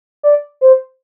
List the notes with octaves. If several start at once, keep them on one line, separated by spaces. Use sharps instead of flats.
D5
C5